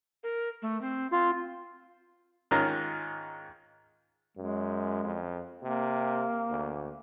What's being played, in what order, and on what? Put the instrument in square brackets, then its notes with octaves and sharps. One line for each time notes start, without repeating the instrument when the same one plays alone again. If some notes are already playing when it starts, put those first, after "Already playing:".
[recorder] A#4
A3
C4
[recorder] C4 [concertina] F4
[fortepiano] G#2 D#3 C#4 F4 A#5
[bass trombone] F#2 [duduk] G#3
[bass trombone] F2
[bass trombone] C3 [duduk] A#3
[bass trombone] D2